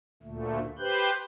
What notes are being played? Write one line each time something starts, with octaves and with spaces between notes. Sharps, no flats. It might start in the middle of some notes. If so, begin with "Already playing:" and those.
D2 A#2 D3 A3
G4 B4 C5 F#6 G6